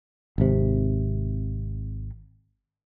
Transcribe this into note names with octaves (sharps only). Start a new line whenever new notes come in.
G#1 C3